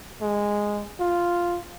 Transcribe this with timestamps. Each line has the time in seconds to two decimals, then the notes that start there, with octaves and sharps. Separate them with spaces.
0.21 G#3
1.00 F4